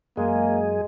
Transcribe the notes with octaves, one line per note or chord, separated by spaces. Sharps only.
F#2 G#3 A#3 G#4